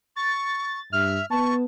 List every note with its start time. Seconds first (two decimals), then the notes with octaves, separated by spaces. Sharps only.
0.16 C#6 A6
0.93 G2 E5 F6
1.30 B3 A5 C#6